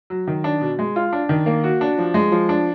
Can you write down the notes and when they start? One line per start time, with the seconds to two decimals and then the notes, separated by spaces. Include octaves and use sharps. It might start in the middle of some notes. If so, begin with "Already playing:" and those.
0.10 F#3
0.27 D#3
0.44 D4
0.61 B2
0.79 G#3
0.96 F4
1.13 D4
1.29 D#3
1.46 A#3
1.64 F#4
1.81 D4
1.98 F3
2.14 G#3
2.32 F3
2.49 D4